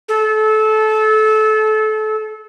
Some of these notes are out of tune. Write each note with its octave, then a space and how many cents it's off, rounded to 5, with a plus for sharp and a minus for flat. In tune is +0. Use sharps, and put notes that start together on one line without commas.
A4 -25